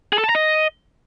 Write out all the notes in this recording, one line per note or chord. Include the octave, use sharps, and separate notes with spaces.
G#4
A4
A5
A#5
D#5